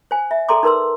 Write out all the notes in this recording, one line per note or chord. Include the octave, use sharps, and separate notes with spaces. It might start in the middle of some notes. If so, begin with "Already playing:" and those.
C5 G#5
E5
G#4 A4 D5 A#5 C6 D6
D#4 A#4 B4 C6 E6